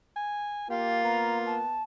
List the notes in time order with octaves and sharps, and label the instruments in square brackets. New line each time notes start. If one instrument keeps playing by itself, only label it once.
[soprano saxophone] G#5
[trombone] A#3 [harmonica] F4 [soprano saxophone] G4
[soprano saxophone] B3 [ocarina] A#5
[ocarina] A5